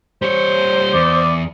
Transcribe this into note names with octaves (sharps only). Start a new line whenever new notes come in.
G3 C5 C#5
E2 D5